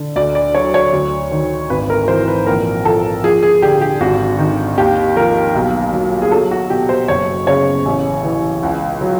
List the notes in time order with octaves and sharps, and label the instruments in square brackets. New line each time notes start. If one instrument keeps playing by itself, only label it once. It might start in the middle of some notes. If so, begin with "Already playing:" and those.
Already playing: [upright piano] D3
D2 D5
D5
F#3 C#5
C#5
D2
D#3
G#1 B4
A#4
E3 C5
B4
A#1 A#4
F3 A4
F3 G#4
G#4
D3 G4
G4
G#1 F#4
D#3
D#2 G4
F3 A#4
B1
F#3
G#4
F#3 A4
F#4
B2 G4
C5
F#1 C#5
C#3 C#5
A1
E3
C#2
F#3